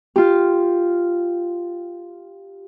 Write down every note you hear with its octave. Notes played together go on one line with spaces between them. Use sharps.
F4 G4